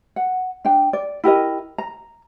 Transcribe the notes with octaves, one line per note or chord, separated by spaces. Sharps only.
F#5
D4 G5
D5
E4 G4 A#4 D#5
A#5